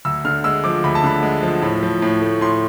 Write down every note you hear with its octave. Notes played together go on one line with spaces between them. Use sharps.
D2 E6
D3 F6
G#3 E6
F3 D6
D2 B5
A5
D3 B5
G#3
F3
A2
F3
A2
A3
A2 C6